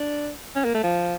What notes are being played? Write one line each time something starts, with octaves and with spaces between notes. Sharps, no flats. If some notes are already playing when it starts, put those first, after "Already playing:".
Already playing: D4
C#4
A#3
A3
F3